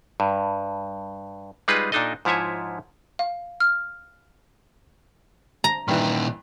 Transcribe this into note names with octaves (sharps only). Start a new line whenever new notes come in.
G2
G3 G#3 D#4 F4 G#4 B4
A#2 D4 D#4 A4 D#5
G#2 F3 E4 C#5 E5 G#5
F5
F6
A#5
G2 A#2 D#3 E3